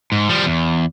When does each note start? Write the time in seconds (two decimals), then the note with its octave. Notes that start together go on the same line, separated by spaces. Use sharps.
0.12 G#2
0.29 F3 G3
0.46 E2